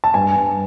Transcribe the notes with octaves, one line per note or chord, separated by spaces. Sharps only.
A5
G2 G#5
G2